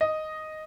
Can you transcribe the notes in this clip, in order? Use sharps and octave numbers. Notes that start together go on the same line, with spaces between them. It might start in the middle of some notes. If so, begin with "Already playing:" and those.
D#5